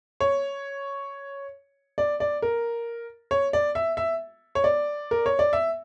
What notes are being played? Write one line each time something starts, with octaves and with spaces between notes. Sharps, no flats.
C#5
D5
D5
A#4
C#5
D5
E5
E5
C#5
D5
A#4
C#5
D5
E5